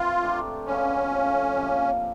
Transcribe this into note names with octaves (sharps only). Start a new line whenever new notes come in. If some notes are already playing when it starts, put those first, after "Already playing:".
Already playing: E3 C4 F4
A3 D4 G4 A#4
F3 G#3 B3 C#4
C3 F3 A3
C3 F3 A#3